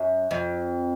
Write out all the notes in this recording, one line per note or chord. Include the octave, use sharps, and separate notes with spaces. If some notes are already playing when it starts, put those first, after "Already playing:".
Already playing: F#2
F2